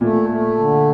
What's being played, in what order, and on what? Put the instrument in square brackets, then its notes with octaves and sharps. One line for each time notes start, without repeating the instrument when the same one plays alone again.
[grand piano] A#2 [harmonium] A3
[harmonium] A3
D3